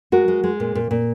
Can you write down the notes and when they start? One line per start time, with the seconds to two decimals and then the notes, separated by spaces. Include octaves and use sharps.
0.12 G#3 F#4 A#4
0.28 G#3
0.44 G#3
0.60 A#2
0.75 A#2
0.91 A#2